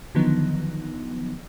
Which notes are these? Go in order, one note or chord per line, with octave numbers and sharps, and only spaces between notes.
D3 D#3 F3 F#3 B3 D#4